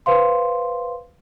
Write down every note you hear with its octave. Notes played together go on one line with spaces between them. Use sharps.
B4 C5 F5 C6